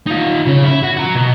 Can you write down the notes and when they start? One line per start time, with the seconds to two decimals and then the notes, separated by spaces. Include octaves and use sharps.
0.07 D#4 F4
0.47 C#3 C#4
0.65 E4
0.83 F#4
0.97 F#4 A#5
1.15 B2